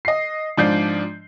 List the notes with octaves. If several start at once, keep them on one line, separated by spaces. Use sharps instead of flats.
D#5 C7
G#2 F3 D4 G6 C7